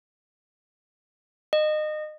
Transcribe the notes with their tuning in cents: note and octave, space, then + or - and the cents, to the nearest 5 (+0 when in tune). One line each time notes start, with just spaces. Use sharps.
D#5 -25